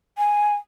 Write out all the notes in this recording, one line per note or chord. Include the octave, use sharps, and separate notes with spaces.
G#5